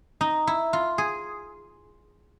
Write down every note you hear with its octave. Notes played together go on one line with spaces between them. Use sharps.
D#4
E4
F4
G#4